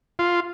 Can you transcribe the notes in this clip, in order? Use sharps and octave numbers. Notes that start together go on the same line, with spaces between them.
F4